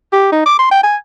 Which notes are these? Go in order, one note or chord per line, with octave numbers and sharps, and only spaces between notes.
G4
D#4
D6
C6
G5
G#5